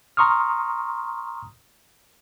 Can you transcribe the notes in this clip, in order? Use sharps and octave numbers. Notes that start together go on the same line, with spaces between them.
A#5 C6 C#6 D#6 F6